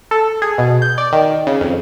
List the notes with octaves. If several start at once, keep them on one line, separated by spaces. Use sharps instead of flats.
A4
G#4
B2
G6
D5
D#3
C#3
F2